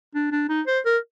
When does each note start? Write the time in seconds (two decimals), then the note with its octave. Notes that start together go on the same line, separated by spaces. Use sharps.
0.15 D4
0.32 D4
0.49 D#4
0.67 C5
0.85 A#4